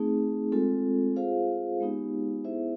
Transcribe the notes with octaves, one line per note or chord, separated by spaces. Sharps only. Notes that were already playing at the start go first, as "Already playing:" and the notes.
Already playing: A3 C4 D#4 G#4
G#3 C4 F4 A4
F4 G#4 C5 F5
G#3 B3 D#4 G4
B3 E4 G#4 C5 E5